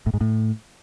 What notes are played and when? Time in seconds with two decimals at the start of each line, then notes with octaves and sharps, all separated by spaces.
0.06 A2
0.14 G#2
0.21 A2